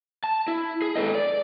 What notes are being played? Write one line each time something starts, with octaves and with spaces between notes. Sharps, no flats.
A5
E4
G#4
G#2 F3 A4 B4 D#5
D5